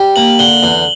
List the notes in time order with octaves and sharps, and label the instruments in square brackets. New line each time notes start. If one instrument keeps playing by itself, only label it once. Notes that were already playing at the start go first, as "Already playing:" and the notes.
Already playing: [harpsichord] G3
[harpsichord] A#3 [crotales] F#7
[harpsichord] D3 [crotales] G7
[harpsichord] E2